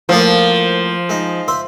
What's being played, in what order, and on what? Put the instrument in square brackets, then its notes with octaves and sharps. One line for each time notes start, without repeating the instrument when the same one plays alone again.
[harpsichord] A2 A#3 [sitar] F3
[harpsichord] G#3 D#4
C5 E5 C6